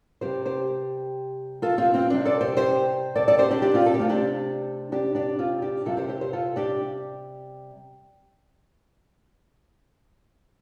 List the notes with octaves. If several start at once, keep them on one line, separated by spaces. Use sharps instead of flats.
C3 G3 C4 G4 C5
G4 C5
F4 A4
C4 F4
C4 F4
C3 G3 C4 D4
A4 D5
G4 C5
G4 C5
A4 D5
A4 D5
G4 C5
D4 G4
D4 G4
C4 F4
A4
G4
C3 A3 C4 F4
D4 G4
D4 G4
D4 G4
C4 F4
D4 G4
C3 G3 C4 F4 A4
G4 C5
G4 C5
G4 C5
F4 A4
D4 G4